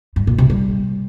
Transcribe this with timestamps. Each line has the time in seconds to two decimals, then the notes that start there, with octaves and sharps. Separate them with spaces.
0.16 G2
0.27 A#2
0.38 C3
0.50 G3